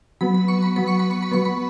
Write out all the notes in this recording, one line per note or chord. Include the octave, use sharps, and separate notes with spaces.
F#3 B3 B5
B5
C#6
B5
F#3 B3 B5
C#6
B5
C#6
B5
F#3 B3 C#6
B5